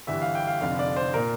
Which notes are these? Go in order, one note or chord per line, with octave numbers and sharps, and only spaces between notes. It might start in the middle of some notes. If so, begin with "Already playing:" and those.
G1 G2 E3 E5
F5
G5
F5
F1 F2 D3 F5
D5
C5
A#2 A#4